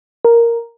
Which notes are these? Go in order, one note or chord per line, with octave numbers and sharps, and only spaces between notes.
A#4